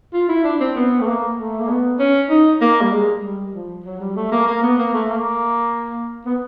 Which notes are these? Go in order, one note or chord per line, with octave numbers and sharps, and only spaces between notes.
F4
E4
D4
C4
B3
A3
A#3
A3
A#3
B3
C#4
D#4
A#3
G3
G#3
G3
F3
F#3
G3
A3
A#3
A#3
B3
A#3
A3
A#3
B3